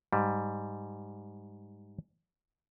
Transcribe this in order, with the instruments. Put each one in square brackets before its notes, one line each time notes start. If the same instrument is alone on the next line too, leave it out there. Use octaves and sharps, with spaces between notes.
[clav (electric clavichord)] G#2 G3